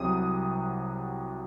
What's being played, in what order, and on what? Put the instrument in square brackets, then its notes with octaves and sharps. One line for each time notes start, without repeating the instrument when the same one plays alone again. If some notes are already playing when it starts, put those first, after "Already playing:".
Already playing: [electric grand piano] C2 C3 F#3 D#6